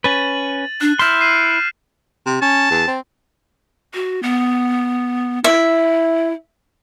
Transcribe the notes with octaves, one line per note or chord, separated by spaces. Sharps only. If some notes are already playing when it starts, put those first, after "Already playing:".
C#4 B4 A6 D#7 F#7
D4 F#6
E4 C6 F6 G6 B6 E7
C7 D#7
C3
C#4 A5
E2
C4
F#4
B3
E4 E5